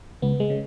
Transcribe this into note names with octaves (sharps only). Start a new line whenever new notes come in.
C#2 B3
G#3
C#3